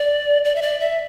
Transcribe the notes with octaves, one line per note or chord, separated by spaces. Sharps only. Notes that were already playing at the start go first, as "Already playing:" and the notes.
Already playing: D5
D5
E5
D5
E5